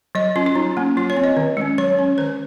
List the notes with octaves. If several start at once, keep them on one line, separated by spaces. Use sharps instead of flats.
F#3 D#5
C#4 F4
F4
F#3 D#4
A#3 C#4
F#3 F4
C#5
C4
D#5
D#3
G#3 C#4
F#3 C#5
C#4
D#3 C5